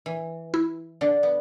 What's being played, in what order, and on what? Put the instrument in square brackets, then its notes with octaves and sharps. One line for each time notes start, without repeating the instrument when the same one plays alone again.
[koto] E3
[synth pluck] E4
[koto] D3 D4
B3